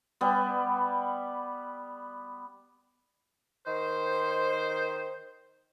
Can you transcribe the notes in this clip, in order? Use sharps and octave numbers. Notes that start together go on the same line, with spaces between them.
G3 B3
D#3 C5